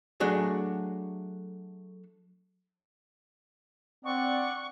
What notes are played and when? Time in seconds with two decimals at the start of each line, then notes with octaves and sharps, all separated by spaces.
0.20 F#3 A3 D4 F#4 G#4
4.05 C4 D4 D5 F#5 C#6